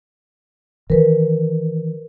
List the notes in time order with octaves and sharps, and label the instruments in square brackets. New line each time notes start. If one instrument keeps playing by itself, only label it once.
[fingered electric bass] D#3 E3 [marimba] A#4 B4